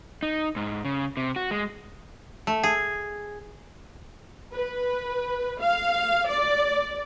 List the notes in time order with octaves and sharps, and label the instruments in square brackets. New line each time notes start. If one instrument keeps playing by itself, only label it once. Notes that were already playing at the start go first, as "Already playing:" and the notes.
[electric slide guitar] D#4
G#2
C#3
C3
F#4
G#3
[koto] A3
G#4
[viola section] B4
F5
D5